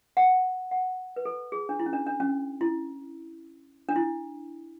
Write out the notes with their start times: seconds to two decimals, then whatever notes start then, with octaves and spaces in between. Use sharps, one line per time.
0.17 F#5
0.71 F#5
1.16 B4
1.25 A4
1.52 G#4
1.69 D4
1.80 E4
1.86 C#4
1.93 D4
2.07 D4
2.20 C#4
2.61 E4
3.89 D4
3.96 E4